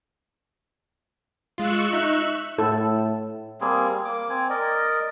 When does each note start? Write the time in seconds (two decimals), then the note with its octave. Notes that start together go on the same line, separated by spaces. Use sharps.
1.58 G#3 F4 C#6 E6 F#6
1.93 D#4 E5
2.58 A2 E4 A4
3.61 G3 A#3 C4 G#4
4.05 A#3 D6
4.30 C4 G#5
4.50 A#4 D5 D#5